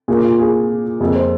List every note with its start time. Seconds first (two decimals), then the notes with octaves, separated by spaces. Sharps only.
0.08 A#2 A#3 G#4
0.24 F4
0.39 G#4
1.00 F2 F3 A#3 G#4
1.16 C5